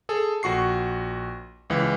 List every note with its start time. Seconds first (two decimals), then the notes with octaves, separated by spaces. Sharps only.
0.09 G#4 A4
0.43 A#1 F#4 C#6 C7
1.70 C#2 E3